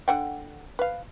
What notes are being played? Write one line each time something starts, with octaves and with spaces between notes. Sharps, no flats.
D3 F#5 G5
B4 F5